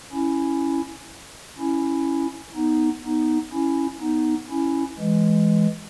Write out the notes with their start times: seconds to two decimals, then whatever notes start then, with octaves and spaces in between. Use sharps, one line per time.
0.12 C#4 E4
1.59 C#4 E4
2.55 B3 D#4
3.04 B3 D#4
3.53 C#4 E4
4.01 B3 D#4
4.50 C#4 E4
4.99 E3 G#3